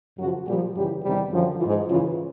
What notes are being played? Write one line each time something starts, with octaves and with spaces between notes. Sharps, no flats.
F#2 C#3 F3 F#3 F#4
A#2 G3 G4
F3
F#2 C#3 E3 G3 G4
E2 C3 D#3 G3 G4
F#2 D3 F3
E3 F3 F4
G#2
F#2 C#3 E3 F3 F4